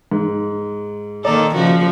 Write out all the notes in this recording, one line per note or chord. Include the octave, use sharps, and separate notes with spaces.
G#2
D#3 A#3 A4 D5 A#5 D6
C#3 F3 F#4